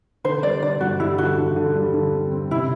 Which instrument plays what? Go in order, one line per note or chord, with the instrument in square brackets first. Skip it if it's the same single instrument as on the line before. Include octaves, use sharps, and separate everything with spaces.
[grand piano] D3 [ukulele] C5
[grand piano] G3 [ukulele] D5
[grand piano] D3 [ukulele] D5
[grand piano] G2 [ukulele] F#4
[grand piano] G3 [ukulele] E4
[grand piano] D3 [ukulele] F#4
[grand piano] D3
D3
G3
D3
C4
C4
[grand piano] C3 [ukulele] E4